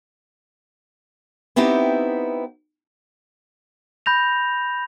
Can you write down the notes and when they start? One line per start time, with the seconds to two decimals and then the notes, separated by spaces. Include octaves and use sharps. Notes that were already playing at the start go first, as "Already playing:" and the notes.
1.56 B3 C4 D#4 E4 G4
4.06 B5 G6 A#6 F7